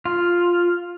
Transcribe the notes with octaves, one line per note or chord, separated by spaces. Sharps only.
F4